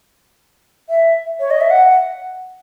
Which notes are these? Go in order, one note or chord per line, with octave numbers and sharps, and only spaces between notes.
E5
C#5
D#5
E5
F#5